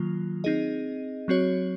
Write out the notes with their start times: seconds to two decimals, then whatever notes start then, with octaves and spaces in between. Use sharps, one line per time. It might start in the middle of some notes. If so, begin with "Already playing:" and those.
Already playing: D#3 F#3 A#3 F4
0.44 C4 D#4 G#4 D#5
1.28 F#3 C4 F#4 C#5